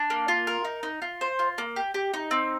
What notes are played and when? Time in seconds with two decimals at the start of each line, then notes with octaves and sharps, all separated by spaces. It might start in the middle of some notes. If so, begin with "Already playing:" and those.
Already playing: D4
0.10 A#3
0.28 F4
0.47 A#4
0.65 D#4
0.83 D#4
1.02 F4
1.21 C5
1.39 F4
1.58 A#3
1.76 G4
1.94 G4
2.14 D#4
2.31 C4